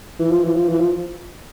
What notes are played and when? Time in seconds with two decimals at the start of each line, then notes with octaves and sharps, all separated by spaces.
0.19 E3
0.31 F3
0.44 E3
0.56 F3
0.68 E3
0.80 F3